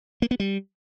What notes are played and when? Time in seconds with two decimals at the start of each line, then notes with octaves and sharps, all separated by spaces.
0.22 A#3
0.31 B3
0.40 G3